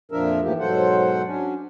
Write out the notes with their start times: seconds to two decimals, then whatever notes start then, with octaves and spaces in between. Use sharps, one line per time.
0.12 F2 A#2 F3 D4 A#4 E5
0.43 G#2 E3 F3 A3 A#3 G4
0.59 G#2 B2 F#3 A4 C5 F#5
1.26 F#3 C#4 D4